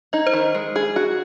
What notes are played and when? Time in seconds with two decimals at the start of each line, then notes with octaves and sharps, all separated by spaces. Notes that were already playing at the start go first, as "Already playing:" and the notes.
0.13 D#4 D#5
0.27 C5
0.33 D#3
0.54 G#3
0.76 G#4
0.96 F#4